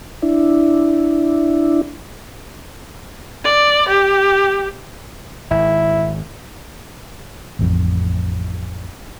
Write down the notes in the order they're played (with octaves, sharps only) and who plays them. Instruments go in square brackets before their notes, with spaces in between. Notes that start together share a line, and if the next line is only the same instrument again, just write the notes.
[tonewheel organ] D4 E4
[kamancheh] D5
G4
[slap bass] G#1 [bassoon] E4
[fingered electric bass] A1 F2